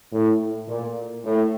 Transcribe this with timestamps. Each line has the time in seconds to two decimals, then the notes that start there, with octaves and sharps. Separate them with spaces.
0.13 A2
0.68 A#2
1.24 A2